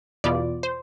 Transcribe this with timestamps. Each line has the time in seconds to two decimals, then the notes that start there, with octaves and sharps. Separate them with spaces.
0.24 E2 B2 B3 F4 D5
0.63 C5